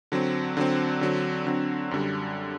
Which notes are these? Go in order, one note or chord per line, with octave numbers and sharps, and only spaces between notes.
D3 F#3 C4
D3 F#3 C4
D3 F#3 C4
D3 F#3 C4
F#2 D3 G3